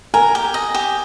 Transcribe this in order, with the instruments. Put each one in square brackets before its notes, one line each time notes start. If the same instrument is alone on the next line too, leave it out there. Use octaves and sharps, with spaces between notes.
[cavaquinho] A#4 [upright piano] G#5
[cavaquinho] G4
D#5
G4